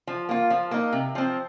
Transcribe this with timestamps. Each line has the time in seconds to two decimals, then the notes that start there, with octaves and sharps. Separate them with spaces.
0.07 F3
0.29 A#3 F4
0.50 F3
0.71 A#3 D#4
0.92 C3
1.15 F3 C4